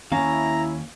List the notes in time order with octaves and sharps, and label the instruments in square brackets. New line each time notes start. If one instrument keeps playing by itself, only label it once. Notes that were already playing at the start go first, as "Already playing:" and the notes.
[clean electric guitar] D#2 A#3 F5 [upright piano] C#4 [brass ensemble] E4 [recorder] A#5